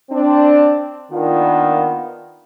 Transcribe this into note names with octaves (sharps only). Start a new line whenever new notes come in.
C4 D4
D#3 A#3 B3 D4 F4